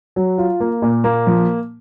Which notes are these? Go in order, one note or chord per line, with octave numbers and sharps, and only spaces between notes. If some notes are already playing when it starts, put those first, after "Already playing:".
F#3
F4
A#3
A#2
A#3
F3